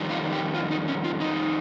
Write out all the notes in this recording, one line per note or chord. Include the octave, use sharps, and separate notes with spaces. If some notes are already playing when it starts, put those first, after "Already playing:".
Already playing: F2 D#3 G3
F4
G4
F4
D#4
C#4
F4
D#4